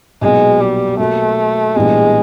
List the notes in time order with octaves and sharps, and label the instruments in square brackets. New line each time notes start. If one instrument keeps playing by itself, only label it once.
[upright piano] B1 A#2 F#3 B3 [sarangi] G#3
[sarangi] G3
[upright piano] B2 F#3 A#3 [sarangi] A3
[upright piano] A#1 A2 E3 G3 B3 [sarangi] G#3